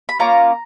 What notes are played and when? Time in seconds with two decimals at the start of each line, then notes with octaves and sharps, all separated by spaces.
0.09 B5
0.19 A#3 C#4 F4 A#5